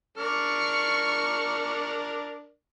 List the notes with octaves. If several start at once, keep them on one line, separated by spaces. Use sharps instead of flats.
D4 A#4 D5 C#6 F6